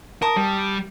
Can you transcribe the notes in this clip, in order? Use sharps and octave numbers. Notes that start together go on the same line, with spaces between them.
A#4 A5 C#6 D#6
G3